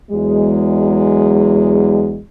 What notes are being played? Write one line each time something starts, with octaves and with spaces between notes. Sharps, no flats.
E2 F#3 G#3